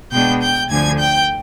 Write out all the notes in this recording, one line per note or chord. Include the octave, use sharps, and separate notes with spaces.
B2 G#3 B3 D4 G5 G6
G5 G6
D2 D3 F3 G#5 G#6
G5 G6